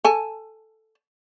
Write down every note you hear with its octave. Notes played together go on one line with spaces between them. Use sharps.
A4 G#5 A5